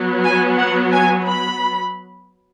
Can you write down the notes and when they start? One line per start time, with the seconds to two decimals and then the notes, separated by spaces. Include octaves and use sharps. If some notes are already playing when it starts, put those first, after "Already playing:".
Already playing: F#3 B3
0.24 G#5
0.58 F#5
0.92 G#5
1.26 B5